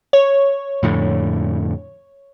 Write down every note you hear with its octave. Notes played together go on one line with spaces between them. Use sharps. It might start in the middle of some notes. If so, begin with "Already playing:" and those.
C#5
F2 A2 D3